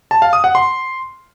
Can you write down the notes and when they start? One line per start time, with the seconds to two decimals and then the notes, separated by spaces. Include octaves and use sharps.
0.11 A5
0.22 F5
0.33 D#6
0.44 F#5
0.55 C6